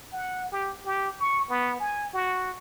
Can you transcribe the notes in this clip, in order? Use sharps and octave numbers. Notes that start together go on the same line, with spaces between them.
F#5
G4
G4
C#6
B3
G#5
F#4